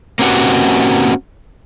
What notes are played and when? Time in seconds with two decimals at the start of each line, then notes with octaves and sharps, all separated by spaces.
0.19 A#3 C4 C#4 F#4 G4 B4